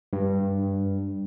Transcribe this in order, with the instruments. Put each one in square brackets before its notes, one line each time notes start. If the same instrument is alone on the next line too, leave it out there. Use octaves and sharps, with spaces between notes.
[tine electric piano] G2